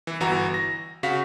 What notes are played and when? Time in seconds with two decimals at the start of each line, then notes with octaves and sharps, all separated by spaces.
0.07 E3
0.20 G1 E3 F#4 A#5
0.54 A#6
1.03 C#3 F#4 F5 B6